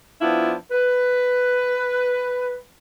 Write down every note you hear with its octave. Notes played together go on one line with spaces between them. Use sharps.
F3 B3 D4 E4 F4
B4